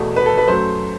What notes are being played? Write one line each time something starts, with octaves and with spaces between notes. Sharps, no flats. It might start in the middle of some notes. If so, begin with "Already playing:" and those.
Already playing: E2 B2 A3
B4
A4
B4
F#2 F#3 A3 C5